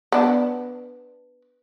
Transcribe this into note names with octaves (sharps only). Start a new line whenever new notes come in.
B3 D4